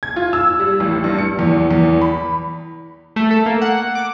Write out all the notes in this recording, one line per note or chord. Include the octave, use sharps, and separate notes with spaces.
G#6
F4
E6
G3
A1
G2
C#7
E2
E2
B5
A3
A4
A#3
F#5
D6